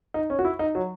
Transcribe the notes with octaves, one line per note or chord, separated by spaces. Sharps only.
D#4
C#4
F#4
E4
D#4
F#3